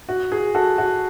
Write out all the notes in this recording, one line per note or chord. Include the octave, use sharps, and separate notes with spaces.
F#4
G#4
F#4 A4
F#4